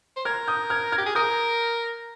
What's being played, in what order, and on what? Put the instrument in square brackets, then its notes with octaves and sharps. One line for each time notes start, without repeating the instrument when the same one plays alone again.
[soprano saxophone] C5
[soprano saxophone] A#4 [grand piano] F6 G#6
[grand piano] D#6 G6
F6 G#6
F6 G#6
[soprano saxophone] G4
G#4
[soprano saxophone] A#4 [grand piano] D#6 G6